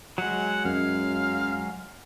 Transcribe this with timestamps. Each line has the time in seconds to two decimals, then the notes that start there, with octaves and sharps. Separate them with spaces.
0.18 F#3 G#3 F#5
0.65 F#2 F5